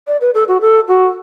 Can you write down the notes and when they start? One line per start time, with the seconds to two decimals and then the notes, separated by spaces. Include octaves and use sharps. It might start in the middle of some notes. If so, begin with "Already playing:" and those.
0.07 D5
0.21 B4
0.34 A4
0.48 F#4
0.61 A4
0.88 F#4